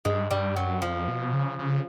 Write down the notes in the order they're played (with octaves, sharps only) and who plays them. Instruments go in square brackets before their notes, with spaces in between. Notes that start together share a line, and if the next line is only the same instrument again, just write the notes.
[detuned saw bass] G2 [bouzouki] G#3
[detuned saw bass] G2 [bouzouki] G3
[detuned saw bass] F#2 [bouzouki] F#3
[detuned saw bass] F2 [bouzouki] F3
[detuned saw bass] B2
C#3
C#3